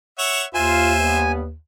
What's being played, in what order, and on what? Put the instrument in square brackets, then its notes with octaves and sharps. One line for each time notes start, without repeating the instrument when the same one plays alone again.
[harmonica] C#5 E5 F#5
[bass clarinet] D#2 [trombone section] F4 [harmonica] C5 E5 [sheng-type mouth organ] G#5
[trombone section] G2 B3